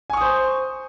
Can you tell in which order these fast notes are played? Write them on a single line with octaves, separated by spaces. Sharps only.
G#5 C#6 D#6 C5